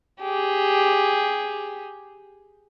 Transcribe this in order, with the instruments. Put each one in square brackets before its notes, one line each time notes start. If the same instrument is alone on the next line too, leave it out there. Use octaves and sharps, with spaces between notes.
[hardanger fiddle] G4 G#4